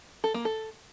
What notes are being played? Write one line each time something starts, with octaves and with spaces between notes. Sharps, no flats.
A4
A#3
A4